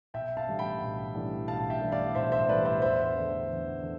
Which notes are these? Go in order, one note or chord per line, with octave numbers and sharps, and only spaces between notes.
B1 E5 G5
F5 A5
A2 E3 G3 D4
G5 B5
B1
A2 E3 G3 D4
B1 F5 A5
E5 G5
A2 E3 G3 D4
D5 F5
B1 C5 E5
C5 E5
A2 E3 G3 D4 B4 D5
C5 E5
E2 C5 E5
D3 A3 D4
E2
D3